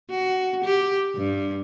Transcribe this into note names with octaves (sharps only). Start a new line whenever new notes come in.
F#4
G4
G2